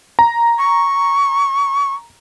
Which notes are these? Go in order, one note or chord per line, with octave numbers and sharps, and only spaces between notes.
A#5
C#6